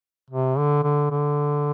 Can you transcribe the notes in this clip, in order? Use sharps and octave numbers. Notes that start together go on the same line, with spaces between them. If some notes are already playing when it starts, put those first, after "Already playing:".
C3
D3
D3
D3